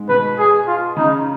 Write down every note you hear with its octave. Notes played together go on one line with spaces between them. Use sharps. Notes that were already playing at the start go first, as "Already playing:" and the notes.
Already playing: G#2 G#3
B2 B3 B4
G#4
F4
C#3 C#4 D#4